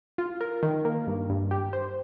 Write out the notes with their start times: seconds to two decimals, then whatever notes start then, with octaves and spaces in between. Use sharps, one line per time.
0.18 F4
0.41 A#4
0.63 D#3
0.85 A#3
1.07 G2
1.30 G2
1.51 G4
1.73 C5